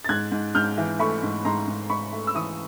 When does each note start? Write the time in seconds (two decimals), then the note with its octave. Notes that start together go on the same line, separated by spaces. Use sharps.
0.04 A6
0.09 G#2 F#6 G#6
0.32 G#2
0.55 G#2 F6 G6
0.78 E3
0.99 A3 B5 C#6
1.23 G#2
1.45 G#2 A#5 C6
1.68 G#2
1.90 G#2 B5 C#6
2.12 A3
2.27 E6
2.35 E3 C#6 D#6